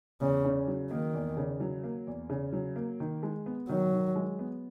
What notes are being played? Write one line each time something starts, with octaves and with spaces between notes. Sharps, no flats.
E2 C#3
C#3
F#3
D#3 A#3
E2
C#3
F#3
A#3
E2
C#3
F#3
A#3
D#3
G#3
B3
D#3 F#3
D#3
G#3
B3